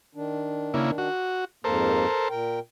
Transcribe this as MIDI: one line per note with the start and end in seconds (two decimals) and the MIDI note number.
0.15 1.08 51
0.15 1.08 62
0.74 0.91 49
0.74 0.91 58
0.74 0.91 64
0.98 1.45 66
1.64 2.05 41
1.64 2.05 44
1.64 2.05 58
1.64 2.28 69
1.64 2.28 70
1.64 2.28 72
2.30 2.59 46
2.30 2.59 70
2.30 2.59 79